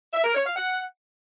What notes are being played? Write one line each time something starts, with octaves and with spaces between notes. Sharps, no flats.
E5
A#4
C#5
F5
F#5